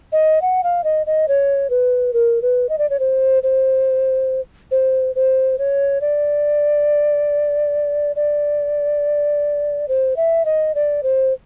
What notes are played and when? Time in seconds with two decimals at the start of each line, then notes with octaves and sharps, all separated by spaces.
0.12 D#5
0.42 F#5
0.63 F5
0.84 D#5
1.06 D#5
1.28 C#5
1.70 B4
2.13 A#4
2.42 B4
2.69 D#5
2.78 D5
2.90 C#5
2.99 C5
3.43 C5
4.71 C5
5.15 C5
5.58 C#5
6.01 D5
8.16 D5
9.88 C5
10.16 E5
10.45 D#5
10.75 D5
11.03 C5